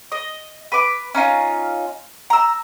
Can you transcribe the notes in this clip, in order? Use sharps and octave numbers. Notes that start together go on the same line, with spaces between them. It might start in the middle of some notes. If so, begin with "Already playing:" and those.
D#5
B4 D6
C#4 D#4 F4
A#5 E6